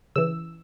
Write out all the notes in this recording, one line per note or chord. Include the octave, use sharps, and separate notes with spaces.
C#3 E3 E6